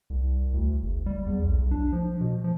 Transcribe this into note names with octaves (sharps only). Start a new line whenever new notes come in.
C2
D2
F#1
G3
E2
B1
B1
D4
F3
B2
F3